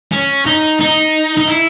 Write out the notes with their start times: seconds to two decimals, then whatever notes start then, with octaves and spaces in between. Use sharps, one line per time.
0.12 C#4
0.46 D#4
0.81 D#4
1.38 D#4
1.49 E4